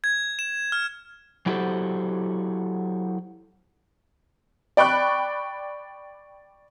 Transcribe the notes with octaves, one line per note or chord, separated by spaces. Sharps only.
G#6
E7
F6
F#3 E4 F#4 G4 A4 C5
D5 G5 B5 C#6 F#6